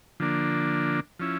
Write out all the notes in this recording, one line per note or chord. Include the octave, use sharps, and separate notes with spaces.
D3 F3 A#3 D4
F3 C#4 E4